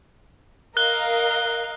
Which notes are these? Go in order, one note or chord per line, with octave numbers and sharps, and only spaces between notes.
A#4 D#5 F5 F#6 G7